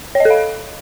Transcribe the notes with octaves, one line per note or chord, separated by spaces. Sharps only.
C#5
D#5
A4
F5